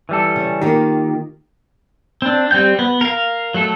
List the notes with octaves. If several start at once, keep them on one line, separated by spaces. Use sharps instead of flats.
E3 G3 A4
C#3
D#3 A#3 F4 G4
C4 D4
G3 C4 G5 G6
B3
A#4 F5
F#3 A3 A4